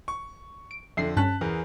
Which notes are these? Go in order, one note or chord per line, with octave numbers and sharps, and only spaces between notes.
C#6
D7
F2 D3 E5 C7
G2 C#4 A5 F#6 B6
E2 G#4 A#4